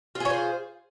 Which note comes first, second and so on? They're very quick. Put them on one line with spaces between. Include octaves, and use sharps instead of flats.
F4 G#4 C#5 C5